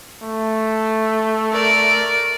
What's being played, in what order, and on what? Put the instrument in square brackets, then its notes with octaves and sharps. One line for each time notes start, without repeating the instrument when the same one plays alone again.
[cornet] A3
[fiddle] A#4 D5